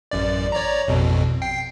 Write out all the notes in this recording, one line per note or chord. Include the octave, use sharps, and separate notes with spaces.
A1 F#2 D5
C#5 D5 A#5
A1 F2 B2
G5 C7